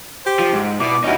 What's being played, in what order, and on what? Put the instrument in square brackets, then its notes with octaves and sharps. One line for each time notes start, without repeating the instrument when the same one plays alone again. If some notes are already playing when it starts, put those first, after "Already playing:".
[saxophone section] G4 C5
[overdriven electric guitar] F3
G#2
[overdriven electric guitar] B2 [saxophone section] E4 D5
[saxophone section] D#2 C#4 F#4 [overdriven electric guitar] D#4 E4